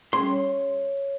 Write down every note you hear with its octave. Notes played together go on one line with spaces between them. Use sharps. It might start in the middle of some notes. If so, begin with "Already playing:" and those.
G3 C#4 G#4 C6
C#5